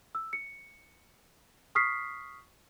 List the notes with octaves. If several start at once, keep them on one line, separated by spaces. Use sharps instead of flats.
E6
C#7
C#6 D#6 F6 B6 C7